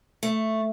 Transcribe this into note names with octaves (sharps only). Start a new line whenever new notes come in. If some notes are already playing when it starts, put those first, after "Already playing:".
A3